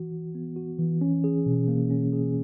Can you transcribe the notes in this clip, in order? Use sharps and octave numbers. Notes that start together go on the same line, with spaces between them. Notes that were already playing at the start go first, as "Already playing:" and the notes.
Already playing: E3 F#4
E3
B3
F#4
E3
C#4
G#4
B2
A#3
C#4
G#4